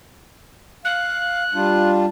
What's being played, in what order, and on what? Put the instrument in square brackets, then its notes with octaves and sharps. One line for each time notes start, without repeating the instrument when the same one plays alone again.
[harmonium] F5 [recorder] F#6
[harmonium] G3 D4 F4